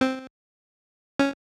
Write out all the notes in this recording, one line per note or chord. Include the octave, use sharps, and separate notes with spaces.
C4
C#4